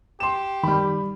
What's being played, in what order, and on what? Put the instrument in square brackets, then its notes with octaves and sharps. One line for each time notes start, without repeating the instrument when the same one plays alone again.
[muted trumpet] G4 [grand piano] C6 E7
[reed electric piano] D#3 [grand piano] G3 B5